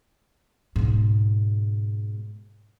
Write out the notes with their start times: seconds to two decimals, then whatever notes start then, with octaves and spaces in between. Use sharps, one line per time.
0.76 G#2 B2